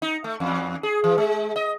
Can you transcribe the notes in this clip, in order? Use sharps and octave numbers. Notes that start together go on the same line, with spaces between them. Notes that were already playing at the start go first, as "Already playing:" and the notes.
D#4
A3
E2
G#4
E3
G#3
D#5